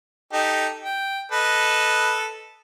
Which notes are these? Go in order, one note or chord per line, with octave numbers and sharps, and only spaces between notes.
D#4 G4 A4
G5
A4 B4 D#5